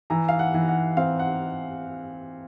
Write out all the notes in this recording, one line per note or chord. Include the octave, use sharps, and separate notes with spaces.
E3 A#5
F5
F#5
E3
F#5
C4 F5
F#5